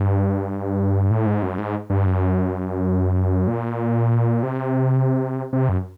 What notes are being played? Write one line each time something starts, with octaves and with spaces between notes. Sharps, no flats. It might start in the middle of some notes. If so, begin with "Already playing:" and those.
Already playing: G2
A2
G#2
F#2
G#2
G2
F#2
A#2
C3
C3
F#2